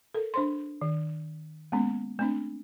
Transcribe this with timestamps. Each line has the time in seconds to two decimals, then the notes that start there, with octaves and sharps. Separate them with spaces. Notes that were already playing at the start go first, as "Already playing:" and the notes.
0.15 A4 A#4
0.34 D4 C5 C6
0.81 D#3
1.72 G#3 A#3 B3 C#4
2.19 A3 C4 D4